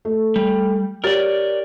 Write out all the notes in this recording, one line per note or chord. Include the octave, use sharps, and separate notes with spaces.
A3
G3
G4 A#4 C#5 D5 A6